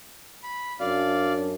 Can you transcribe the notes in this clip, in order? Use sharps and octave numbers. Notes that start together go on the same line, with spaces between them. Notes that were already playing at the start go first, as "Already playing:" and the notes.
B5
F#2 D4 D5 F5